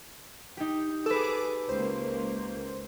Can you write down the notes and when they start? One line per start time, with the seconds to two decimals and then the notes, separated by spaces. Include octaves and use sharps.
0.57 D#4 G4
1.06 G#4 A4 B4 D6 E6
1.69 C#2 A#3 C5